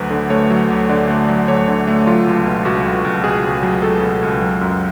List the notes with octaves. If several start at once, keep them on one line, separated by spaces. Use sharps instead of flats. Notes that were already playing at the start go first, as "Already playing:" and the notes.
Already playing: D2 F#3 B4
D3
A3 C#5
F#3
D2
D3 D5
A3
F#3
D2 C#5
D3
A3
F#3 F4
C#2
B2
C#2 F#4
F#3
C#2
B2 G#4
C#2
F#3
C#2 A4
B2
C#2
F#3
F#2